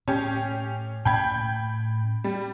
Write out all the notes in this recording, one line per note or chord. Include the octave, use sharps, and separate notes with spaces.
A2 C#4 G4
A2 C#4 G5 B5 G#6
G3